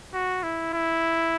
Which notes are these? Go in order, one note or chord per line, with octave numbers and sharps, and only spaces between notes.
F#4
E4
E4